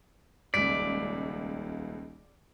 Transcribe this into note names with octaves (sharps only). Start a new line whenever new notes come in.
D#1 C#2 D5 B6